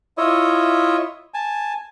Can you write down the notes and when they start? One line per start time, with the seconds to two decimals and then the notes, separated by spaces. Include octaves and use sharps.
0.18 E4 F4 C#5 D#5 E5
1.34 G#5 A5